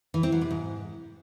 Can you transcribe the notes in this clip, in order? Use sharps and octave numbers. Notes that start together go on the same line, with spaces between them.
E3
C4
F#3
C3
G#2